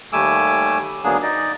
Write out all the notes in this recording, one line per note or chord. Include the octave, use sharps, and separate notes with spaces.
D#2 G3 A3 G#5 D6 E6
D2 F#3 A#3 B3 D4 G#4
D#4 D5 D#5